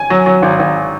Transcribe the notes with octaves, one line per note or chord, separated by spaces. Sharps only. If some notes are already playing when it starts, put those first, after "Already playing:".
Already playing: G#5
F#3
F#3
G#1
G#1